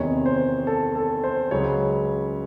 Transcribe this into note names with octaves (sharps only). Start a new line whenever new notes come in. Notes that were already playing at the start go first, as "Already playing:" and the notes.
Already playing: E2 C3 D#3 C#5
C5
A4
A4
C5
C#2 C#3 F#3 C#5